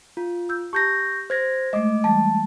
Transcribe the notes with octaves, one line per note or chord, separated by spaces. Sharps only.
F4
E6 G6
G4 A5 A#5 C#6 G6 A#6
C5 G#6 A#6
G#3 A3 D#5 D6
E3 G3 G#3 A5